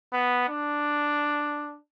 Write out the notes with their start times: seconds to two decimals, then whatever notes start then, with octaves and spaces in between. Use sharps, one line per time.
0.13 B3
0.49 D4